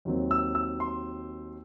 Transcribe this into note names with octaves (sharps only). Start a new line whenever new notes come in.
D#2 D#3 F#3 C4
E6
E6
C6